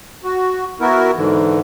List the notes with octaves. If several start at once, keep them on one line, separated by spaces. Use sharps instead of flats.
F#4
B3 E4 F#4 A#4
G#2 D3 E3